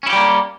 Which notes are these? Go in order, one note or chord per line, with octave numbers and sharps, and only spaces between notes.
G3 A#3 C#4 E4 G4